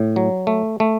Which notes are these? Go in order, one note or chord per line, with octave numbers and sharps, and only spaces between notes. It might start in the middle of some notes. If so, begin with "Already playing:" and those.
Already playing: A2
F#3
A3
A3